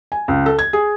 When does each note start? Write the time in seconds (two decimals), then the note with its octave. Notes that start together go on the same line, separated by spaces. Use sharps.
0.12 G#5
0.28 C#2
0.46 A4
0.59 G#6
0.73 G#4